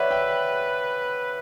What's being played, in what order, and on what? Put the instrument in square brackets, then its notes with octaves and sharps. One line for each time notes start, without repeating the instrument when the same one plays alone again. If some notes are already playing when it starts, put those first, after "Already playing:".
Already playing: [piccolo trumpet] B4 [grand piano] C#5 D5 E5 F#5
[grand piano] E5 G5